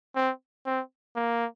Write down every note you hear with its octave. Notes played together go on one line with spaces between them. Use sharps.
C4
C4
A#3